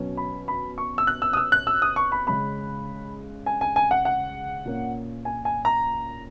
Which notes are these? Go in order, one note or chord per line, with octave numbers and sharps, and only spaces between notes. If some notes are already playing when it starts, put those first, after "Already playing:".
Already playing: B2 F#3 C#4
B5
B5
C#6
E6
F#6
E6
D#6
E6
F#6
E6
D#6
C#6
B5
C#3 G#3 C#4 B5
G#5
G#5
G#5
F#5
F#5
A#2 A#3 C#4
G#5
G#5
A#5